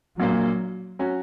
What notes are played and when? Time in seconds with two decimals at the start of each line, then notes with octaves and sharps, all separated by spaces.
0.20 A#1 A#2 F#3 A#3
0.99 F#3 C#4 F#4